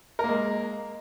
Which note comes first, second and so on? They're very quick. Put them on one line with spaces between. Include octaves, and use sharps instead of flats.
A#4 A#3 G#3